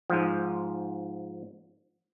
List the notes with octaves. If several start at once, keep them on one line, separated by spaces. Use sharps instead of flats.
G#2 F3